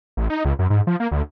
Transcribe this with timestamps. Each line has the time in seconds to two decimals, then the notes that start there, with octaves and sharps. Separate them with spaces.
0.17 A1
0.30 D#4
0.45 C#2
0.59 F#2
0.70 G#2
0.87 F3
1.00 A#3
1.11 D2